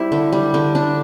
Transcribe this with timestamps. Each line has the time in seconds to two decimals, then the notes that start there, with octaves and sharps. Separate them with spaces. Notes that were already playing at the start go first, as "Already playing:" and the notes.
Already playing: G3 C4 E4
0.12 D3
0.33 G3
0.54 D3
0.75 D4